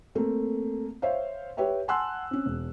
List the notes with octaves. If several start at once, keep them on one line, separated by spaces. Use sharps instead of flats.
A3 A#3 C4
C5 C#5 E5 F5
G4 B4 C#5 E5 G5
F#5 G#5 A5 C6 E6 F#6
C4 C#4
E1